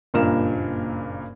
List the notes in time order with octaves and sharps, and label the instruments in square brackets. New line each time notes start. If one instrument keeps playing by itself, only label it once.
[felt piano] F#1 G2 A#2 A#4 E7